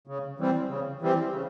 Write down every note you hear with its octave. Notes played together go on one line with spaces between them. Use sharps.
C#3
E3 G3 C4
C#3
E3 G3 C4
C#3